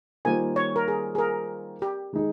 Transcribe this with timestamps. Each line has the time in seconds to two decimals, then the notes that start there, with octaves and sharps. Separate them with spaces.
0.25 D#3 G3 A#3 F4 C5 G#5
0.56 C#5
0.76 A#4
0.88 G#4
1.15 G#4
1.18 A#4
1.82 G4
2.13 D#3 G#3 D#4 G#4